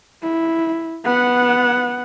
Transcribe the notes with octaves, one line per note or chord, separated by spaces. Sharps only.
E4
B3 F#5